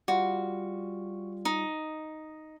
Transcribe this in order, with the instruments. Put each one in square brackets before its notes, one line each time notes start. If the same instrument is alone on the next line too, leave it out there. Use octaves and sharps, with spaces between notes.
[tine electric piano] G3 F4 [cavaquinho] F#4
[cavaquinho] D#4